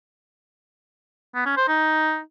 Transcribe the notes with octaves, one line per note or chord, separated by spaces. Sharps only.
B3
C#4
C5
D#4